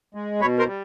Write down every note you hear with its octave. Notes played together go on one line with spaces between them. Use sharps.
G#3
B2 B4 C#5
A#4 C5
G3